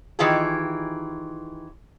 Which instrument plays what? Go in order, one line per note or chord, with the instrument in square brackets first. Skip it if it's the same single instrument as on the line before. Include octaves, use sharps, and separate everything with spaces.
[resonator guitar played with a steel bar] D#3 E3 F4 G4 G#4